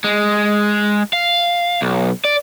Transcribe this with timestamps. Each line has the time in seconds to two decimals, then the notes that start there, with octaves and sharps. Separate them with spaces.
0.04 G#3
1.13 F5
1.82 B1
2.24 D5